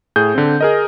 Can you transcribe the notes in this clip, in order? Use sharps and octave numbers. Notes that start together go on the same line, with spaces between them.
A2 G#4 G6
D3 C4
G#4 A#4 D#5